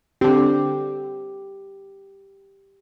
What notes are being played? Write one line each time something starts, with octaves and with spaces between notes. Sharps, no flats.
D3 C4 G4